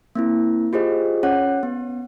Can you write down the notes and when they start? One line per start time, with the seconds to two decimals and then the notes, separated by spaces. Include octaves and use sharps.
0.15 A#3 C4 E4
0.73 F4 G4 G#4 C5 D#5
1.23 C#4 C#5 F#5 F#6
1.63 B3